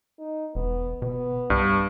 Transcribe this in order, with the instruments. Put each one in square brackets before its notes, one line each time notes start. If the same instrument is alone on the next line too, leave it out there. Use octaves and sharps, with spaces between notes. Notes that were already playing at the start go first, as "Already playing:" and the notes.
[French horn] D#4
[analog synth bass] E1 [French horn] B3
[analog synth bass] B2 [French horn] B3
[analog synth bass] C2 [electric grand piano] G2